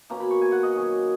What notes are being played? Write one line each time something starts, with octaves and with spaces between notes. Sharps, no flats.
B2 A#3 C#4 A#5
B5
C#6
G#5
F#5
D#5
D#3 F#3 C#4